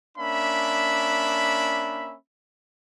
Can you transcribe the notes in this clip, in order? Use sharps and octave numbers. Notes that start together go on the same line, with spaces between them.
A#3 C#4 D4 E5 B5